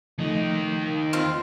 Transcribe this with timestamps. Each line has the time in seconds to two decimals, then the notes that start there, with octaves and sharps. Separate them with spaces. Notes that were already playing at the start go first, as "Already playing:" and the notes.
0.18 D#2 C#3 F3 A3 D#4
1.13 C4 F4 C6